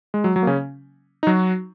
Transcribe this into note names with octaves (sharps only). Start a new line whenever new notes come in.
G#3
F#3
F#3
A#3
C#3 C#4
D#4
F#3 F#4